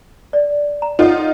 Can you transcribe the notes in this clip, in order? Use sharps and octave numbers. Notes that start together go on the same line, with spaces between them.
D5
A#5
D#4 F4 A4 C#5 F#5